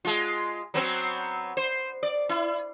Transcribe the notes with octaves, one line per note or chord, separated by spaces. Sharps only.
G#3 F4
F#3 B3 C4
C5
D5
E4